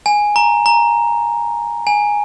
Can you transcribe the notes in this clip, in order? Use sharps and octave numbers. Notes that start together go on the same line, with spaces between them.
G#5
A#5
A#5
G#5